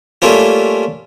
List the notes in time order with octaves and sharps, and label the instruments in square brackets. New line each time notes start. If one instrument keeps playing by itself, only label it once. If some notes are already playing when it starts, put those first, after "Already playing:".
[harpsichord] G3 A3 A#3 C#4 F4